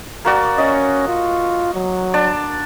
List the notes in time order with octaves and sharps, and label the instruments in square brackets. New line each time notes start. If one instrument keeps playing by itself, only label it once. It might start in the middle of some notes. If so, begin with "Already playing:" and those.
[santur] A#3 F#4 D5
[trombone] C#4 [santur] D#5
[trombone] F4
F#3
[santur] D4 D5